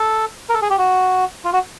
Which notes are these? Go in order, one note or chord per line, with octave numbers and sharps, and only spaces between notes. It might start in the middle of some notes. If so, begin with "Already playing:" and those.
Already playing: A4
A#4
A4
G#4
G4
F#4
F4
F#4